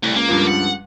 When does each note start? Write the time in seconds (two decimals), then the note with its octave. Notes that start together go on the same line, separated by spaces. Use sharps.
0.03 C2 A2
0.16 C#2 A#3
0.29 G2 F3
0.47 F#5